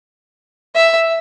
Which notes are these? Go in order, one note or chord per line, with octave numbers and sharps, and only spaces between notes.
E5